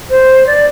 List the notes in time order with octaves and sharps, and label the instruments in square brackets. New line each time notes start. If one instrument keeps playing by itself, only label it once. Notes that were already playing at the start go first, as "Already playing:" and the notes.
[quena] C5
D5